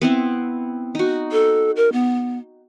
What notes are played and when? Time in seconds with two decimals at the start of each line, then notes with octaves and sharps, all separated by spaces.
0.02 B3 C4 E4
0.95 D#4 F#4
1.32 A4
1.76 A#4
1.92 B3